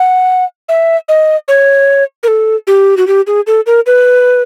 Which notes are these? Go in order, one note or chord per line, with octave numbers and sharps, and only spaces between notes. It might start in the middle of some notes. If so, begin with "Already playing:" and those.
Already playing: F#5
E5
D#5
C#5
A#4
A4
G4
F#4
G4
G#4
A4
A#4
B4